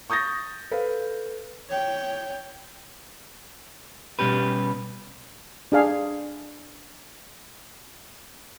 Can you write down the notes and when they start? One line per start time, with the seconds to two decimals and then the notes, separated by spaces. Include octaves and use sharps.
0.10 C#6 D#6 G6 A6 A#6
0.71 A4 B4 F5
1.69 C#5 G5
4.19 B2 G3 C#4 G4 B4
5.72 D4 G#4 F5 G#5